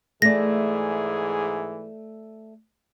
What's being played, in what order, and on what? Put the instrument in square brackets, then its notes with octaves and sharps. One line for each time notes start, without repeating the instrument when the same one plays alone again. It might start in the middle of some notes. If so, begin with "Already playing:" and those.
[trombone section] G#2 E3 G#4 [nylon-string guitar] A3 D5 [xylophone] A#6